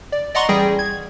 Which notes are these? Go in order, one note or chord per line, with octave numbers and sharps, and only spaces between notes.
D5
D5 D#5 F#5 A#5 C6 C#6
A1 G3 G#4 G5 A#6
G#6